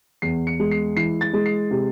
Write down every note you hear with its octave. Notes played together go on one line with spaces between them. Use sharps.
E2 C7
C#7
G#3
C7
E3 C7
A6
G#3
C7
C3